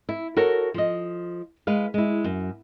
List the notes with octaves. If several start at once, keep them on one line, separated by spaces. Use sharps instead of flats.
E4
F#4 A4 A#4 C#5
F3 D#5
G#3 B4 F5
G#3 E4
F#2